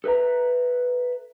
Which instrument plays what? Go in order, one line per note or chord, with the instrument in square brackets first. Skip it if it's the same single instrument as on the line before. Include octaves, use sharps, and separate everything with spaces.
[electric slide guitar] A4 B4 E5 A#5